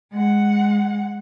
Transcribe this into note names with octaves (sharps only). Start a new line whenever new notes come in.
G#3 F#5